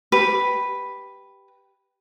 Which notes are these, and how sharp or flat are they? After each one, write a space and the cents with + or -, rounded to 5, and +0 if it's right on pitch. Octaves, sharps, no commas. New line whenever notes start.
G4 +0 B4 +0